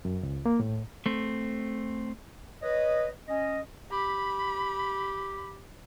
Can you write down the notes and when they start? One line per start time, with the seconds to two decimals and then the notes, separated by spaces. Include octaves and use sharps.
0.05 F#2
0.23 C#2
0.46 A#3
0.60 A2
1.06 A3 C4
2.62 B4 C#5 D#5
3.28 C#4 D#5
3.92 G4 B5